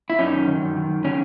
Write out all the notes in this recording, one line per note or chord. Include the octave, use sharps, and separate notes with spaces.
E4
F#2 C#4 D#4
D#3
D#3
F#2
D#3
F#2
D#3 C#4